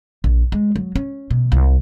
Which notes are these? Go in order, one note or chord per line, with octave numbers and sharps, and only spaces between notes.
A#1
G#3
F#3
C#4
B2
C2